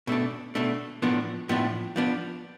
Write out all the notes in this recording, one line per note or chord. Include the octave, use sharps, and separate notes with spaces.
B2 A3 D4
B2 A3 D4
A2 F3 B3 D4
A2 F3 B3 D4
F3 B3 D4